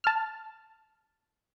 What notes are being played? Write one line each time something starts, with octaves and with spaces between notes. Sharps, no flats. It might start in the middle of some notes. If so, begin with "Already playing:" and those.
A5 F6